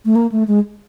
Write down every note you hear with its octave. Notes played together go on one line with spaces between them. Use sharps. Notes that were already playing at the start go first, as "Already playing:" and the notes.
A3
A#3
A3
G#3